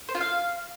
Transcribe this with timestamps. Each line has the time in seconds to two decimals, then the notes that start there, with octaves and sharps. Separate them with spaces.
0.09 C5
0.15 F4
0.21 F5